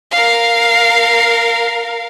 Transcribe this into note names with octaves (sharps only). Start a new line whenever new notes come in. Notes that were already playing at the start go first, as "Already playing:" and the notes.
A#4 F5